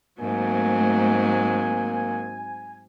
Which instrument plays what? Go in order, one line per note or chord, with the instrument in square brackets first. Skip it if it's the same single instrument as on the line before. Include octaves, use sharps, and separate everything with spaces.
[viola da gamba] G#2 F#3 C4 [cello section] A3 [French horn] A#3 [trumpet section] G#5